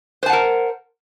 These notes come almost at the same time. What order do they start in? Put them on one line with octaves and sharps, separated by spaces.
C5 A5 F#5 A#4